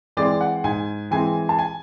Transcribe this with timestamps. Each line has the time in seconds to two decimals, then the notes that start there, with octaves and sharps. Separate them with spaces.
0.17 E3 G#3 C4 D5
0.41 F#5
0.64 G#2 G#5
1.11 E3 G#3 C4 G#5
1.49 A5
1.59 G#5